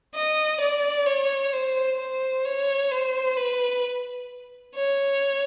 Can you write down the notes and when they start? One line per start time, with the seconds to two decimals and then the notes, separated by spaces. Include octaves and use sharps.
0.15 D#5
0.61 D5
1.07 C#5
1.53 C5
1.99 C5
2.45 C#5
2.92 C5
3.37 B4
4.75 C#5